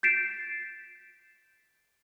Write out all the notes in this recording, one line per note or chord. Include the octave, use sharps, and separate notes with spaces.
G6 A6 B6 C7 D7 E7